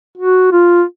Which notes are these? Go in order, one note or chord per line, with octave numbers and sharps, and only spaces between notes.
F#4
F4